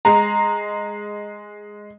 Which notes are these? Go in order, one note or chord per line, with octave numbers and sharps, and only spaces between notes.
G#3 A#5